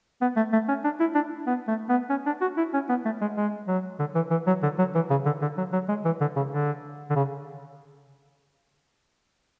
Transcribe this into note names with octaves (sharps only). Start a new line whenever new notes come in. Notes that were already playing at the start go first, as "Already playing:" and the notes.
B3
A3
A3
C#4
D4
E4
D4
B3
A3
B3
C#4
D4
F#4
E4
C#4
B3
A3
G#3
G#3
F#3
D3
E3
E3
F#3
D3
F#3
E3
C#3
D3
D3
F#3
F#3
G#3
E3
D3
C#3
D3
D3
C#3